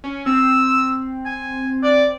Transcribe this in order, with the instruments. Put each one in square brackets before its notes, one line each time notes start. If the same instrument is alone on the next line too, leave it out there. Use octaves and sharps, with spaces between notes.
[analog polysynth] C#4
[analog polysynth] C4 [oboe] E6
[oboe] G#5
D5